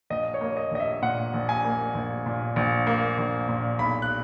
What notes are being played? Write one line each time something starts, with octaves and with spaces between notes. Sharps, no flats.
A#1 D#5
C#5
A#3
D#5
A#1 D#5
E5
A#2 F#5
A#1
G#5
A#3
A#1
A#2
A#1
A#3
A#1
A#2
B1 B5
F#6